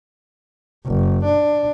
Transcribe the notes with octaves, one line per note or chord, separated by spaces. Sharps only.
F#1
D4